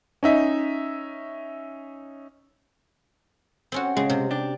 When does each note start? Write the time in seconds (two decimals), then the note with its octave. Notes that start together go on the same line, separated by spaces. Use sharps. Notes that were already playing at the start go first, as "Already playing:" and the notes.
0.23 C#4 D#4 E5
3.72 C4 C#4 F#4
3.97 C#3 G#3
4.10 C3
4.31 D4 G4